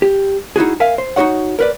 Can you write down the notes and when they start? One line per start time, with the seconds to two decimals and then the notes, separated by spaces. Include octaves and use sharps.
0.02 G4
0.56 D#4 E4 F#4 G#4
0.80 A#4 E5 F5 G#5
0.98 C5
1.16 D#4 F4 F#4 C#5 F#5
1.59 A#4 B4 D5